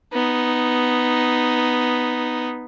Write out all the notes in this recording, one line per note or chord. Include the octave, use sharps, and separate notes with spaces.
B3 D#4